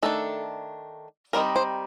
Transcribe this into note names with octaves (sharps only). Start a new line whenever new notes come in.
D#3 A3 D4 A4
D#3 G3 C4 D#4 A#4
C5